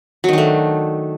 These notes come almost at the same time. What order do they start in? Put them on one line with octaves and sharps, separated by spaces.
F#3 D#3 D4 A3